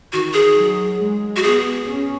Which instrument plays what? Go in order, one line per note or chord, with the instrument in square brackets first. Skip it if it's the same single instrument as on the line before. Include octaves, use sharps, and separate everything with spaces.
[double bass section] D#3 [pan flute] F#4
[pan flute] G#4
[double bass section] F#3
G#3
[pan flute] F#4
[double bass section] B3 [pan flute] G#4
[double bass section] C#4